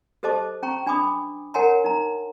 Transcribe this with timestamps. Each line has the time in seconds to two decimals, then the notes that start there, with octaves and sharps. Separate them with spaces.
0.23 G4 A4 C5 D#5 A5 D6
0.63 C#4 G5 A#5 C#6
0.87 D4 G#5 B5 D6 D#6
1.54 A#4 C#5 F#5 G#5 A#5 C6
1.84 D#4 A#5